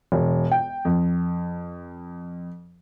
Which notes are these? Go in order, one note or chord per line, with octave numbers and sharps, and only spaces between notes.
E1
G5
F2